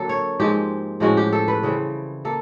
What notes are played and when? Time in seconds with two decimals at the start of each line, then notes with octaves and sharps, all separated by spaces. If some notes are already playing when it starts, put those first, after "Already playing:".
Already playing: D3 F#3 A#3 A4
0.09 C#5
0.40 G#2 F3 G#3 C4 G4
1.00 A2 F3 G#3 C#4 F#4
1.17 G4
1.33 A4
1.48 B4
1.63 C#3 E3 G3 C4
2.25 A#3 A4